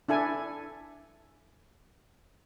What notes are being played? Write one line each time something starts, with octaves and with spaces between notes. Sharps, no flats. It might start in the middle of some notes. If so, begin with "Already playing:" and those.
D4 E4 A4 G#5